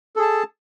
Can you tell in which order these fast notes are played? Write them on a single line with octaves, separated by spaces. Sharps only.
A4 G#4 A5